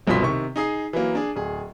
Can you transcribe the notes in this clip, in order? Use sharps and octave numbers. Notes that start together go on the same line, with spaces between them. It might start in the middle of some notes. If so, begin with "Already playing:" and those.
G1 C2 B2 F3 C6 B6
C3 D#3 C#6
D#4 G#4 D#6 C7
E3 F#3 A#3
D4 G#4
D1 G#4